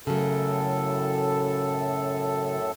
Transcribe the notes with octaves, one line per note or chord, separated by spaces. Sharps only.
F#2 A2 C#3 F#3 A4